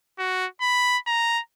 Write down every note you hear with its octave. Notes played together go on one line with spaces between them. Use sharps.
F#4
B5
A#5